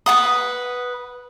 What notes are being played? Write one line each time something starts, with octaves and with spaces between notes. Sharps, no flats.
B4 F#5 D#6